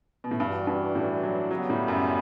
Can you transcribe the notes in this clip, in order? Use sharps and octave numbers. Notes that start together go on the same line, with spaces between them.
B2
A2
G2 E3 G3 D4 F#4
G2
A2
F#3
C#3 F#3 G3 B3
A2
F#2